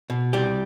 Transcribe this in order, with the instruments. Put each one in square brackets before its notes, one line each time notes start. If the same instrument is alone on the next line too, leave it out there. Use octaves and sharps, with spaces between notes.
[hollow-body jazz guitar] B2
C2 G3 G4